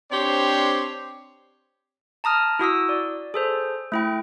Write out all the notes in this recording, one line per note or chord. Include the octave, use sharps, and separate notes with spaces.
C4 D4 G4 C5 C#5
A5 A#5 D#6 F6
E4 F#4 D#6 E6
D5
G#4 A4 C5
A3 E4 G5